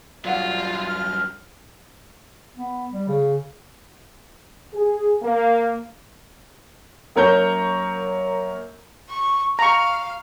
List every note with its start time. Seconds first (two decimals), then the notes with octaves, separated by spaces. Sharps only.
0.25 G2 F#3 F4 D5 F5 F#5
0.88 F6
2.57 B3
2.92 G3
3.08 C#3
4.74 G#4
5.22 A#3
7.16 F#2 A#3 A#4 C#5 A#5 G6
9.10 C#6
9.59 F5 A#5 C#6